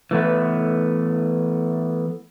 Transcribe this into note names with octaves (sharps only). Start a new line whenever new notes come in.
E3 A3 B3